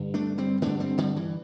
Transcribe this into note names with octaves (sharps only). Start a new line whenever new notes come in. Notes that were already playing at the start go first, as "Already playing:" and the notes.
Already playing: G2 D3
A3 D4
G3 C4
G2 D3 A3 D4
G3 C4
D3 G3
E3